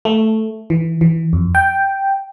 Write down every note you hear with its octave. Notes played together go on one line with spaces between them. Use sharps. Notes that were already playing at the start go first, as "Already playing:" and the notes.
A3
E3
E3
F2
G5